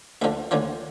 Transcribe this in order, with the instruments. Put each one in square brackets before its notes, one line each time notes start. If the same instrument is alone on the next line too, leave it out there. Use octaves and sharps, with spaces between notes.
[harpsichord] D2 D3 F3 E5
D2 D3 F3 C#5